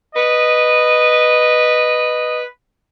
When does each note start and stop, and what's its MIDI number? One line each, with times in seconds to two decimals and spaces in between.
0.14 2.40 71
0.14 2.40 75